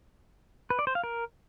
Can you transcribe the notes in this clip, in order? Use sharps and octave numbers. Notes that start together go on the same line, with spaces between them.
B4
D5
C5
F5
A#4